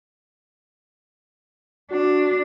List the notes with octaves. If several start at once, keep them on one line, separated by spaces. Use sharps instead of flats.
D4 F#4